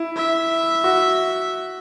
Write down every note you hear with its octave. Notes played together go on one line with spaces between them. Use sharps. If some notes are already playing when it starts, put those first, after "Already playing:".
Already playing: E4
E5
F#4